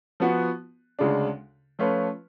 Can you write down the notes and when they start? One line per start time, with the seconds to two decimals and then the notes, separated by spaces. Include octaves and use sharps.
0.20 F3 B3 F#4
0.99 D2 C#3 G#3 D4
1.79 F3 A3 C#4 F4 B4